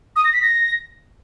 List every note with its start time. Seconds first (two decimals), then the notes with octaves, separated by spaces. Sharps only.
0.16 D#6
0.25 A#6
0.33 B6
0.42 A#6